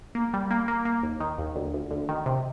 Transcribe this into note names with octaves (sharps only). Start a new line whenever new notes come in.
A#3
G3
A#3
A#3
A#3
D#2
D#3
D#2
D2
D2
D2
D#3
C3